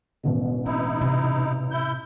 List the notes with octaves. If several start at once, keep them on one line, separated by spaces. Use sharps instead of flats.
E1 A1 B2
C4 D#4 E4
C3
E4 G6